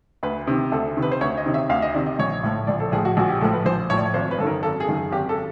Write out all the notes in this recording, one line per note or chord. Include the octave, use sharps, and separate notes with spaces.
D2 B4
C3 D#3
D2 A4
C3 D#3
B4
C5
D2 C#5
D#5
C3 D#3
E5
D2 F5
D#5
C3 D#3 D5
D#5
A#1 C#5
A2 F3
A#1 D5
A4
A2 F3 G#4
F#4
A#1 F#4
G4
A2 F3 A4
B4
A#1 C5
A2 F3 C#5
D5
C#5
G#1 C5
B4
F#2 D#3 A4 A#4
G#1 A4
G#4
F#2 D#3
G#4
G#1 G4
A4